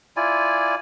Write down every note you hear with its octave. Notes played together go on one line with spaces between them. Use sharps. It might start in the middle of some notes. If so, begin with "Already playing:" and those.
E4 F4 D5 G#5